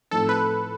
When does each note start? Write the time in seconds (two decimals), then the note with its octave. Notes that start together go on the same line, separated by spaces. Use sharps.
0.11 A2 F3 A3 C4 D#4 A4
0.29 B4